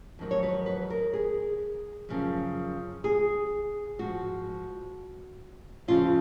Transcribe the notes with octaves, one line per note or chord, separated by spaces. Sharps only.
F2 D#3 F#3
C#5
B4
B4
A#4
G#4
F#2 C#3 F3
G#4
G#2 F3 F#4
F2 C#3 F3 F4